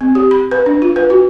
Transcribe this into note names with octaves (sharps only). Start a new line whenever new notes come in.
C4
G4
B5
B4
D4
F4
B4
F#4